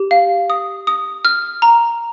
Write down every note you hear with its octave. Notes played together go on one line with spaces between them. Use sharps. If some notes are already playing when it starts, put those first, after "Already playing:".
Already playing: G4
F5
D#6
D#6
F6
A#5